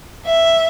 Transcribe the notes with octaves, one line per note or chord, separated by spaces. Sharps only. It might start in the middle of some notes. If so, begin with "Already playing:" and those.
E5